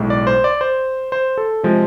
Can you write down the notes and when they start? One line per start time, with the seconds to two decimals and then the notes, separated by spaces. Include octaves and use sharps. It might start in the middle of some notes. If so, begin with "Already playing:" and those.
Already playing: B1 A2 G#3
0.10 D5
0.27 C5
0.44 D5
0.61 C5
1.12 C5
1.38 A4
1.63 C3 F3 G#3